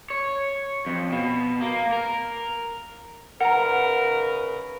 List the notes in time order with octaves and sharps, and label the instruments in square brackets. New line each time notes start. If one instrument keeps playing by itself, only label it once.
[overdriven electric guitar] C#5
F2
B2
A#3
A#4
[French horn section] C#3 D#4 B4 [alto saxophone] A#4 [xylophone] F#5 A#5